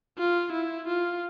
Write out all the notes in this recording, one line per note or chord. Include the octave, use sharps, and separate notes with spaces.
F4
E4
F4